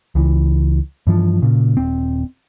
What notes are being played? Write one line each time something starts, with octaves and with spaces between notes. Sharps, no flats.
C#2 E3
G2 E3 F3
A#2 C#3
D#1 C4